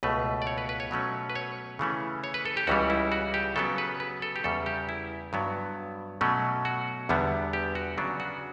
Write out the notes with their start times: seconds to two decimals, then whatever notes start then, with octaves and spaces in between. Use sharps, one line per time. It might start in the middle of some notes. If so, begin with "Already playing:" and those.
0.03 C#2 B2 A3 B4
0.42 D5
0.47 C#5
0.58 B4
0.69 B4
0.80 C#5
0.91 B2 F#3 A3 C#4
1.30 B4
1.35 C#5
1.79 C#3 E3 A3 C#4
2.24 C#5
2.34 B4
2.45 A4
2.57 G4
2.67 C#2 C#3 E3 G3 F#4
2.90 E4
3.12 F#4
3.34 G4
3.56 C#3 F#3 B3 A4
3.78 B4
4.00 B4
4.22 A4
4.36 G4
4.44 E2 C#3 G3 A4
4.66 G4
4.89 E4
5.33 G2 F#3 B3
6.21 B2 F#3 A3 C#4
6.65 F#4
7.09 E2 D3 G3 B3
7.53 G4
7.75 F#4
7.97 C#3 F#3 B3 D4
8.20 F#4